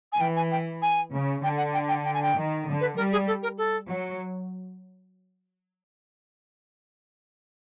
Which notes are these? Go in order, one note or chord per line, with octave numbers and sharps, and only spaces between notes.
G#5
E3 G5
G#5
G5
G#5
C#3
D3 G5
F#5
G5
G5
G5
G#5
G5
D#3
D3
B4
G3 A#4
G#4
A4
A#4
A4
F#3